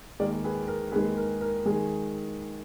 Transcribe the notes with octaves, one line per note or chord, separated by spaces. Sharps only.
D#2 D#3 G#3 A#4 D5
G#4 B4
A#4
D#2 D#3 G#3 G#4 B4
A#4
A#4
D#3 G#3 G#4